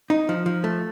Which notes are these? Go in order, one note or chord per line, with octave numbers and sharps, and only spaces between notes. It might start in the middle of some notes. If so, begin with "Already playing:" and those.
D#4
F3
F3
A3